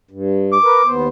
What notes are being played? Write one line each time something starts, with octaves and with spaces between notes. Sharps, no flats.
G2
D6
A#4 B4
D#2 B3 C5